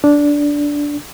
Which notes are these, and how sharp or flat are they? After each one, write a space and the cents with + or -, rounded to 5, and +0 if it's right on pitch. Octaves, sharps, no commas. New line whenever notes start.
D4 -10